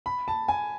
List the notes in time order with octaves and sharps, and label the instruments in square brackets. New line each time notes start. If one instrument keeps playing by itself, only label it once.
[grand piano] B5
A5
G#5